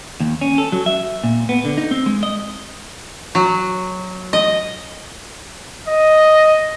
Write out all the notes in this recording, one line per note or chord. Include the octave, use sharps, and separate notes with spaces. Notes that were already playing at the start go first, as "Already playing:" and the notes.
D#2
C#4
A4
F#3
E5
A#2
B3
D3
D#4
C4
G#3
D#5
F#3
D#5
D#5